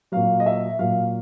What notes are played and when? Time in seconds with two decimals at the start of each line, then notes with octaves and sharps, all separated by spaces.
0.12 A#2 F#3 F5
0.40 D#5
0.46 E5
0.79 A#2 F#3 F5